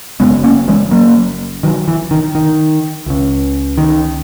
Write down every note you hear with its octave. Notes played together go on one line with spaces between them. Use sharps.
F#1 F#2 C#3 G#3 B3
A#3 C#4
E3 G#3
F#3 A#3
D#3 F#3
E3
D#3
D#3
C#2 C#3
D#3